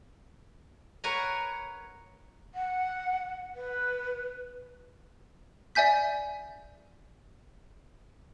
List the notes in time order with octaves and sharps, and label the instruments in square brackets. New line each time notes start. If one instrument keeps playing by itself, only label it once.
[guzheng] A#4 B4 C#5 F#5 G#5 A#5
[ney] F#5
B4
[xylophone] D5 E5 G#5 G6 B6